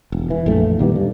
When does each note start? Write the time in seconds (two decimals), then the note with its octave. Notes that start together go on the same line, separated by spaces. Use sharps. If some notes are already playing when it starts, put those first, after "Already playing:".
0.12 E1
0.30 E3
0.46 A#1 F#2 A3
0.79 A#2 D#3 G3 B3
0.95 G2